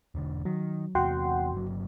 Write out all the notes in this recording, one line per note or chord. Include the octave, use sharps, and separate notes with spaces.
E1 D3
D#3 F#3
E2 C3 F#4 F#5 G5 C6
G1 F#3